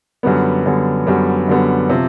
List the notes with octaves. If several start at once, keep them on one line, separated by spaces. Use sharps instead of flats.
F#2 D3 G3 B3
F#2 D3 G3 B3
F#2 D3 G3 B3
F#2 D3 G3 B3
C3 F3